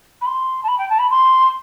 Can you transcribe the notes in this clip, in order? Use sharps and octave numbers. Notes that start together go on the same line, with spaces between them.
B5
C6
A5
B5
G5
A5
B5
C6